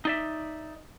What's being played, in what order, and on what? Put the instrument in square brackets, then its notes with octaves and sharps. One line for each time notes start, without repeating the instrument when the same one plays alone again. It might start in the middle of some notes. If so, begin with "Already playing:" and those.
[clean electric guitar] D#4 D5 E5